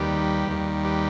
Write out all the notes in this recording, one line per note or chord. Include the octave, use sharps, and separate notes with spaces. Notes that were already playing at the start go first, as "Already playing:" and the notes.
Already playing: D#2 D#3 G3 G4 B4
D#2 D#3 G3
G4 B4